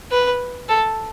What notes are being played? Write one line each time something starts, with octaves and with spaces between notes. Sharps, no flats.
B4
A4